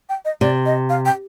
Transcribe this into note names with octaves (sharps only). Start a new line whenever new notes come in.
G5
D#5
C3 D5
D#5
F5
G5